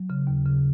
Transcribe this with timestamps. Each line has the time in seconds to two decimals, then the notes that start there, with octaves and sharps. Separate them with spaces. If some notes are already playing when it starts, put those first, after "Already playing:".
Already playing: F#3
0.10 C#3
0.27 D#2
0.46 C#3